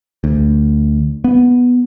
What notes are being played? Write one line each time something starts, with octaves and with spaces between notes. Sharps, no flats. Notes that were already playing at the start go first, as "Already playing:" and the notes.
D2
B3